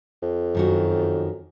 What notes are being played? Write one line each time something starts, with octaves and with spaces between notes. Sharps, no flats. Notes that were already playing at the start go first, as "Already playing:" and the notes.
F2
F#2 D#3 F#4